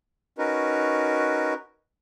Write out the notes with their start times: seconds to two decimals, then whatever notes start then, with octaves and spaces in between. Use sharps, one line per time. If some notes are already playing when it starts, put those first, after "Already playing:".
0.38 C#4 D#4 F#4 A#4 B4